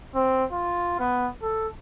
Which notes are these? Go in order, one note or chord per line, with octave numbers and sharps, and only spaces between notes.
C4
F4
B3
A4